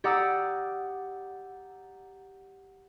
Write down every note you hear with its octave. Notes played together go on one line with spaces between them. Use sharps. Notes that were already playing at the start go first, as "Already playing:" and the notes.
G4 D5 F#5 A#5 D#6 E6